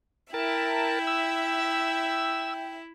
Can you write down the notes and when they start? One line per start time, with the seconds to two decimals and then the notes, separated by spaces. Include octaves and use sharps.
0.34 E4 A#4 E5 G5 A5
1.07 E6